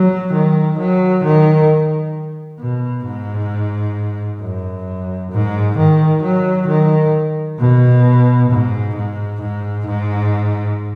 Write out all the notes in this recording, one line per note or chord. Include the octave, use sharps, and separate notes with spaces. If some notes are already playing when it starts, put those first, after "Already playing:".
Already playing: F#3
D#3
F#3
D#3
B2
G#2
F#2
G#2
D#3
F#3
D#3
B2
G#2
G#2
G#2
G#2